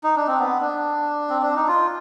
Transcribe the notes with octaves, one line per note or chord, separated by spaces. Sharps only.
D#4
D4
C4
B3
D4
C4
D4
D#4
F4